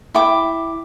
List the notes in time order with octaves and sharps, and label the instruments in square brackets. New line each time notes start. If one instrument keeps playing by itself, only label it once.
[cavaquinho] E4 G5 D6